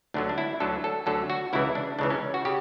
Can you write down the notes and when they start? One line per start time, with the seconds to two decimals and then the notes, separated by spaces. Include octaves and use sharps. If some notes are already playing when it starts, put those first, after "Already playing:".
0.14 D2 D3 F#3 D4
0.29 D4
0.38 E4
0.60 D2 D3 F#3 A4
0.84 A4
1.06 D2 D3 F#3 A4
1.30 F#4
1.53 C#2 C#3 E3 E4
1.75 D4
1.99 C#2 C#3 E3 D4
2.10 C#4
2.34 F#4
2.45 C#3 G4